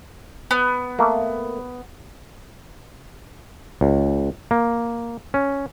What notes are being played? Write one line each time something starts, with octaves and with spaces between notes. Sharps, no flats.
B3
A3 A#3
C#2
A#3
C#4